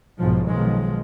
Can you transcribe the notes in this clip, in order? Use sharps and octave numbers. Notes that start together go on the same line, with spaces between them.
B1 G#2 F3
B1 D#3 F3 G#3